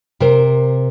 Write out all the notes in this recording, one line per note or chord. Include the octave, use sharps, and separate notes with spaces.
C3 A#4 C5